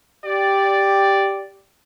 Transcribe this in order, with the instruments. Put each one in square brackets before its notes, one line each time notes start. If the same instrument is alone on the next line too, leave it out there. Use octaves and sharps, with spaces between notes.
[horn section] G4 D5